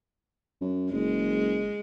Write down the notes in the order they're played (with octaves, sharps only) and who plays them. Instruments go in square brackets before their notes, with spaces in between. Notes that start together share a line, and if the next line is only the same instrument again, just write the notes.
[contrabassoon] F#2
[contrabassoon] F#1 [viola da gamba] G#3